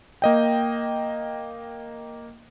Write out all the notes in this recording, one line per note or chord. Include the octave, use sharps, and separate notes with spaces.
A#3 D#5 G5